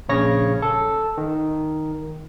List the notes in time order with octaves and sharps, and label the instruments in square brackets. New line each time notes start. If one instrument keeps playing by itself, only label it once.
[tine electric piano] A#1 C#3 C#5 A#6
A4
D#3